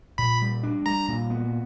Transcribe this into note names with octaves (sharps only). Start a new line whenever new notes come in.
A#2 B5
G3
D4
G3 A#5
A#2
B3